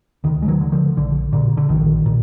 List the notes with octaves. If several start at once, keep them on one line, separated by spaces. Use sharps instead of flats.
D2 D#3
G#3
D#3 F#3
D3
D3 F3
A#1 D3
A#2 D3
D3
A#1 D#3
A#2